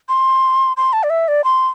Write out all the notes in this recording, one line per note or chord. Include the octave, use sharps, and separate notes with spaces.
C6
C6
A5
D5
E5
D5
C6